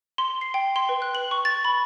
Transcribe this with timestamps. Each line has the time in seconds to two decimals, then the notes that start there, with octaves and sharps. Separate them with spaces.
0.18 C6
0.41 C7
0.54 G5
0.76 C6
0.89 B4
1.02 F#6
1.15 F#7
1.31 C#6
1.45 A6
1.65 B5